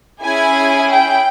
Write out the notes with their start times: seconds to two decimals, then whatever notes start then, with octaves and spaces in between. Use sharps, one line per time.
0.22 C#4 E4 G#4 G#5
0.90 G5